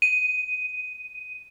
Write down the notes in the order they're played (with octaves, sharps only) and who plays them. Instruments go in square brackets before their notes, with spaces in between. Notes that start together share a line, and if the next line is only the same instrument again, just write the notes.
[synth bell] D#7